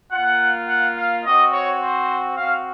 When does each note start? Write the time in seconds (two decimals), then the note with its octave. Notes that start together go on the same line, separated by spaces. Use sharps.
0.12 A#3 F4 F#5
0.69 F#5
0.97 F5
1.25 C4 F#4 D#5
1.53 C#5
1.82 C5
2.37 C4 F#4 F5